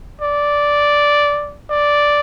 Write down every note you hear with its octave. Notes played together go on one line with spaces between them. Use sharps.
D5
D5